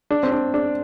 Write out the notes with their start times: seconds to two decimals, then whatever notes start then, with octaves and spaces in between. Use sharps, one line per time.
0.11 D4
0.23 C4
0.32 D4
0.54 D4